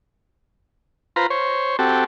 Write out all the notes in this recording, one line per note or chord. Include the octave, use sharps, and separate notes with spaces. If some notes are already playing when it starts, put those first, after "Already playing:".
F4 B4 C5 A#5
C5 C#5
C4 F#4 G4 A4